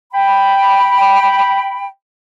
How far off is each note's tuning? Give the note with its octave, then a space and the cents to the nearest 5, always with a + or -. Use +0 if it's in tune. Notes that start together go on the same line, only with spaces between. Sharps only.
G5 +0 B5 +0